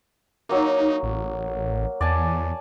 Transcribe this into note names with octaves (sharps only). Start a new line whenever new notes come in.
F#3 A#3 D#4
A1
E2 D5 G#5 A5